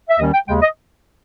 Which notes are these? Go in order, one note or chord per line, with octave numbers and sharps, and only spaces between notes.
E5
D#2 D#3 G3 C#4 D#5
G5
D#2 C#3 G#3 G5
D#5